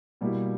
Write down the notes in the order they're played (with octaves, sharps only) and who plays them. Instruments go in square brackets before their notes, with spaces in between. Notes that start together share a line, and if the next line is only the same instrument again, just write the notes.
[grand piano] B2 G3 A#3 E4 G4